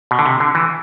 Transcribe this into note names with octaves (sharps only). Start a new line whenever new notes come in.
B2
D3
C3
D3
E3